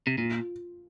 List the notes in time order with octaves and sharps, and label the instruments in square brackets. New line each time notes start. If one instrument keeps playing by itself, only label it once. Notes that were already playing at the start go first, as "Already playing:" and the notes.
[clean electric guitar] C3
[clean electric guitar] A#2 [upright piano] F4